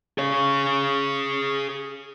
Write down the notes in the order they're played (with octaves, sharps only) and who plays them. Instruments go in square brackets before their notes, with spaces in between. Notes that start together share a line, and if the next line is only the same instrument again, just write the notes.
[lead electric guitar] G#4 C#5